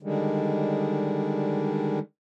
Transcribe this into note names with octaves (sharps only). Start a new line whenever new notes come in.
D3 D#3 G3 G#3